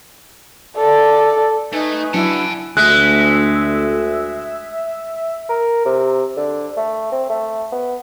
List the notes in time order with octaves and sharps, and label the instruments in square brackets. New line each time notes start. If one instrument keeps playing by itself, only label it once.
[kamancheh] A4 D5
[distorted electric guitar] A3 [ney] D#4 [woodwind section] B4 G#5
[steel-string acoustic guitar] F#3 D4 [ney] E4 [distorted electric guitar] F#5 A5
[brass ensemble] D2 [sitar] G#3 [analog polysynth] E5 [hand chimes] F#6
[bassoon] A#4
C3
D3
A3
C4
A3
B3